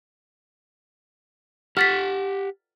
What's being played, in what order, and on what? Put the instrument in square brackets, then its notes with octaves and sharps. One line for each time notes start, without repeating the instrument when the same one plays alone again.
[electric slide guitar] G4 F#5 [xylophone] F6 A6 B6